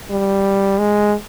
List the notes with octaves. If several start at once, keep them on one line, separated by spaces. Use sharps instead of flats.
G3
G#3